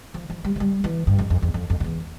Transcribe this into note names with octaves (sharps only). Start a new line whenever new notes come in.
F3
F3
G3
F3
G3
E3
G2
F2
F2
E2
F2
F2
F2
E2